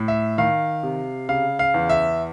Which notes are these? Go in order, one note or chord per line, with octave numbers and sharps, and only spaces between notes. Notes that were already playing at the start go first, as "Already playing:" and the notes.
Already playing: A2
E5
D#3 F5
C3
C#3 F5
F5
E2
E5